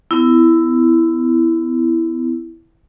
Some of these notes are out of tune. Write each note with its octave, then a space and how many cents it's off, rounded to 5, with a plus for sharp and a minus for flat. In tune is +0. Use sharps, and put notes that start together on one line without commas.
B3 +35 E4 +0